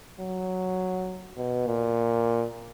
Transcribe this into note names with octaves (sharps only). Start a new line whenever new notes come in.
F#3
B2
A#2